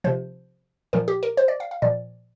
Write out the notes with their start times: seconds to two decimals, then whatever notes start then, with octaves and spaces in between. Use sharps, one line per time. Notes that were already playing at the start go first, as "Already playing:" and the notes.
0.04 C3 F3 C5
0.93 A#2 F3 A#4
1.08 G4
1.23 A#4
1.37 C5
1.48 D5
1.60 F5
1.71 F5
1.82 A#2 F3 D5